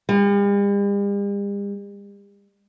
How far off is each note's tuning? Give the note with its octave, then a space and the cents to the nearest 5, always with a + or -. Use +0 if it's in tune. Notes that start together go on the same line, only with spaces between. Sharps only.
G3 +45